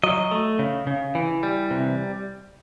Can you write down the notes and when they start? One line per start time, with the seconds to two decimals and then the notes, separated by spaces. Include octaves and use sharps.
0.04 F#3 D#5
0.31 A3
0.59 C#3
0.87 C#3
1.15 E3
1.43 G3
1.71 C3